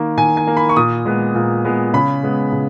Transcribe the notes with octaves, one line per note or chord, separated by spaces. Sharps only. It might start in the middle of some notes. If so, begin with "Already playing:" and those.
Already playing: D#3 A#3
D#3 G#5
G#5
A#3
B5
C#6
A#2 D#6
G#3 B3
A#2
G#3 B3
C#3 B5
G#3 B3
C#3